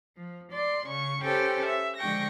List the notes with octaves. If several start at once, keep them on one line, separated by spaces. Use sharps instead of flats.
F3
D5 C6
C#3 C#6
C#4 G4 A4 B4 C5 G5
E5
D3 F3 G#3 G5 C#6 A#6